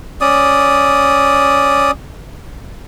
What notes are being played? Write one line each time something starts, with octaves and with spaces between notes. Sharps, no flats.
C#4 D5 D#6